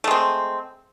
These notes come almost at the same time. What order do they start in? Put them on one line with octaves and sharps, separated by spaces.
A3 G#3 C4